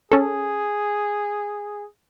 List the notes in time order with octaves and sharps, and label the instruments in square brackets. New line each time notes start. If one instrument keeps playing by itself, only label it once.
[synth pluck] C#4 A4 [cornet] G#4